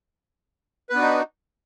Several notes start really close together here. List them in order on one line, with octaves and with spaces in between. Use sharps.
B4 B3 D4 F#4 D#4